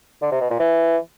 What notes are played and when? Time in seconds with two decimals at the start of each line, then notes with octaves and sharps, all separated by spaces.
0.22 D3
0.31 C3
0.41 B2
0.50 A#2
0.60 E3